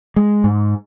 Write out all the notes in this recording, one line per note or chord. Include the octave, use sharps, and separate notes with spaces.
G#3
G#2